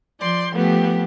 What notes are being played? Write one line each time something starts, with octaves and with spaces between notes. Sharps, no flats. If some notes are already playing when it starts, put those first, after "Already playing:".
F3 D5 C6 G6
F3 A3 B3 G4